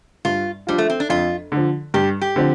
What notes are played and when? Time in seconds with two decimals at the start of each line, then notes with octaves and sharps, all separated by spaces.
0.25 G2 F4
0.67 F3 G3 D4 F4
0.78 A3
0.90 C4
1.00 D4
1.10 F2 F4
1.52 D3 F3
1.94 G2 G4
2.22 G4
2.36 D3 F3 C4